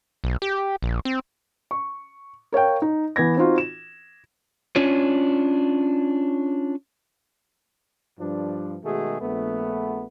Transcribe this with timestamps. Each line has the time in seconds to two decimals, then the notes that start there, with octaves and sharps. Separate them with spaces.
0.24 B1
0.42 G4
0.83 A#1
1.05 C4
1.71 C#6
2.52 A#4 C#5 F5 G5
2.82 D#4
3.16 E3 B3 G#6 A#6
3.37 C4 D#4 F4 F#4
3.58 E7
4.76 C#4 D4 F4 C#5
8.19 G2 F3 D4
8.84 B2 D#3 G#3 A3 F#4 G#4
9.21 A#1 A3 B3